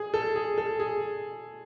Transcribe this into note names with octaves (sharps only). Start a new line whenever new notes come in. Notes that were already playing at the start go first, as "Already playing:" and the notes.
Already playing: G#4
A4
G#4
A4
G#4